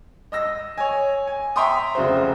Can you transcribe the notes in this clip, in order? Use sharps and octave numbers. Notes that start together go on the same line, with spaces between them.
D#5 E6 A#6
C#5 G#5
G#5
E5 G5 A#5 C6 C#6 D#6
F1 C#3 F#4 C5